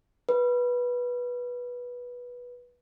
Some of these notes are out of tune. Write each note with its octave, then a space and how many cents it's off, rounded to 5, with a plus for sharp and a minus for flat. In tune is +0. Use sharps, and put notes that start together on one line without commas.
B4 -15